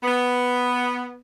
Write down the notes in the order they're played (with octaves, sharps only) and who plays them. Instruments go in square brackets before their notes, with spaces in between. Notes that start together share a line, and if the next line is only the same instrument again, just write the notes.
[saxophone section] B3